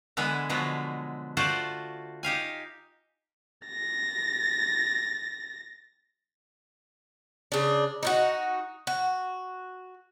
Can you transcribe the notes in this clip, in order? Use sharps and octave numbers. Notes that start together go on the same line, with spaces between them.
D3 E3 G#3 B3 E4
B2 D3 F3 F#3 G#3 B3
A3 F4 F#4 C5 D5 A5
D#4 G4 F5 G#5
A6 A#6
C#3 D4
D#4 F4 F#4
F#4